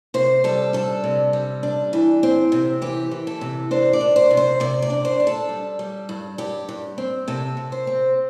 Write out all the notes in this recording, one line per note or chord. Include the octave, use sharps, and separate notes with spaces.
C3 C5
G3 A4
D4 A4
C3
G3
D4
E3
C4
C3
E3 G4
E3
A4
C3
D4 C5
D5
D4
C5
C3
C5
C3 D5
D5
D4
C5
D4
A4
G3
G3
G2
G2 G4
G2
C4
C3 A4
C3
C5
C4